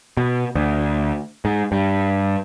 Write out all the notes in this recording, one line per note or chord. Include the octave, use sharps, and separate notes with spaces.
B2
D2
G#2
G2